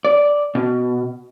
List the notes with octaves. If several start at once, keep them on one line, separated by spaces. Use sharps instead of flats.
D5
B2